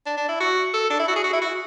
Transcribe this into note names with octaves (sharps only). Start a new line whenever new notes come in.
D4
D4
E4
F#4
A4
D4
E4
F#4
G#4
F#4
E4
F#4